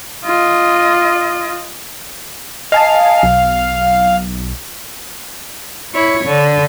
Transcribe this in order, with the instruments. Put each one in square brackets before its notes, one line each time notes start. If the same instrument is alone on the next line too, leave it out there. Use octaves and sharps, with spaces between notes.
[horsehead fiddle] F4 D#5
[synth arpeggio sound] D#5 G#5 A5 [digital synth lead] F5
[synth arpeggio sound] B1
[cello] E4 C#5
D3